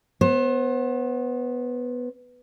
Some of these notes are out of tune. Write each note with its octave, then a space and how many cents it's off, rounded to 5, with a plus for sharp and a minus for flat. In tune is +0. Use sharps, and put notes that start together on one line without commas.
B3 +0 C5 +35